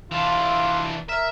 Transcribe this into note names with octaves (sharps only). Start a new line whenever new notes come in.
E3 D4 F4
A#4 E5